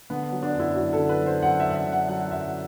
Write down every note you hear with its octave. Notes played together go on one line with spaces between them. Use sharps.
D3 B3
F#3
D4
F#2 E4
F#2 F#4
A4
D3
B4
F#3
C5
F#2 F#5
E5
F#2
F#5
E5
D3
F#5
F#3 F#5
F#2 E5